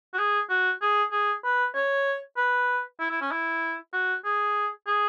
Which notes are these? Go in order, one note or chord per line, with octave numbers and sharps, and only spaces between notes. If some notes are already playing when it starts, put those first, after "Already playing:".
F#4
G#4
F#4
G#4
G#4
B4
C#5
B4
E4
E4
C#4
E4
F#4
G#4
G#4